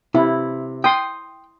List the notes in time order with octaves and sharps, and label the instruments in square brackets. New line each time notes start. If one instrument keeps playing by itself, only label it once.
[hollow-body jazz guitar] C3 [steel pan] E4
[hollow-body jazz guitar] G5 [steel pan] C6 D#6